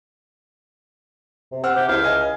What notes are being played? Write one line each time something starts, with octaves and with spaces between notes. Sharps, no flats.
C3
C4 F#5 E6 F6
C3 G4
C#2 E4 E5 F5
D#5 G#5